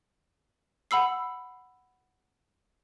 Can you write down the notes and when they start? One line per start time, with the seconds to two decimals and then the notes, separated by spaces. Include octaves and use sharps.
0.91 F#5 B5 E6 C7